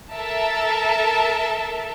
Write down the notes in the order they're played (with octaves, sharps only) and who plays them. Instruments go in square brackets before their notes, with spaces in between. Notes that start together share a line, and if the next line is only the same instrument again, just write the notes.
[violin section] A4 A#4 E5 A5